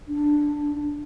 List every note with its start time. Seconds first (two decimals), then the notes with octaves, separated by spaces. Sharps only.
0.08 D4